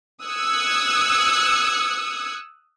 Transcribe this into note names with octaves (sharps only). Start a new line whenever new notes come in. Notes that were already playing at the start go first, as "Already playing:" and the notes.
D#6 E6 F#6 G#6 C#7